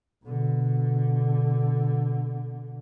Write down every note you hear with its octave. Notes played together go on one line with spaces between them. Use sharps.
B2 D3